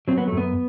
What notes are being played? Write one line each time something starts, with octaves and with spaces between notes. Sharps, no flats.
F#3 C4
B3
A3
F#2 B3